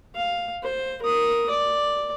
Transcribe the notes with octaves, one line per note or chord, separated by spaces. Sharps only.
F5
C5
A#4 D#6
D5